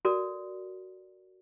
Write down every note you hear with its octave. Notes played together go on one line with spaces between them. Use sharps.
F#4 A4 A#4 D5